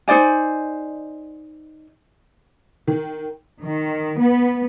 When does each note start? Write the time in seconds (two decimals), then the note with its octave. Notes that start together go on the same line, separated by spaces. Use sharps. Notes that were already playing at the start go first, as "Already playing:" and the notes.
0.08 D#4 C5 D5 G#5
2.87 D#3
3.61 D#3
4.17 B3